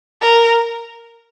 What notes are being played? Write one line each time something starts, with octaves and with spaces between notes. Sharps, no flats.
A#4